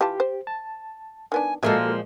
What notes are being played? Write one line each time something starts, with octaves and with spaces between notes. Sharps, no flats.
E3 F4 G4 A5
C5
A5
D#3 B3 D4 G#5
A#2 F3 G#3 A#3 F#4 G#4 A4 E5